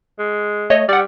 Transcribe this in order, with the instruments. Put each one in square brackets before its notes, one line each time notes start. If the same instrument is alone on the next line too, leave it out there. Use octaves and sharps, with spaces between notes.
[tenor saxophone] G#3
[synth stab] A3 C#5 D#5
[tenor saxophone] G3 [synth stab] D5 F#5